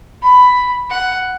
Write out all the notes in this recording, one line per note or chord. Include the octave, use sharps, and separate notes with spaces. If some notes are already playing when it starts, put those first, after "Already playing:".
B5
F#5